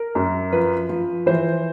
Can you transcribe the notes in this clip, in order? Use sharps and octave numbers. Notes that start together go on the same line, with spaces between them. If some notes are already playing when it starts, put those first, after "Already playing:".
Already playing: A#4
F#2
F3 B4
F3
E3 C5